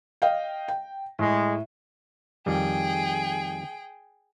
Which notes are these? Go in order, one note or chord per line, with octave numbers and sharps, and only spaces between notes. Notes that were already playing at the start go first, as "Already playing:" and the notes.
D#5 F5 G5
G5
A2 G#3
F2 D#3 G3 G#4 G5